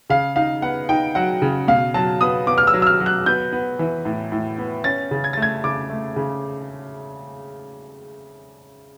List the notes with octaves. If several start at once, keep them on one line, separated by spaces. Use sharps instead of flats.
C#3 F5
D#4 F5
B3 F#5
D#4 G5
F#3 F#5
C#3
B2 F5
F#3 A5
B3 D#6
B3 D6
F6
E6
F#3
E6
F6
F#3
F#6
B3 G6
B3
E3
A2
A2
B3
C#4 A6
C#3
G#6
A3 A6
G#6
C#3 D6
A3
C#3